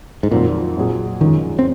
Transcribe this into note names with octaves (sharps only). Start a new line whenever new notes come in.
G#2
F2 A#2 D#3 F#3 C4
A#2 F#3 C4 F4 G#4
F#2 D#3 F3 G#3
C4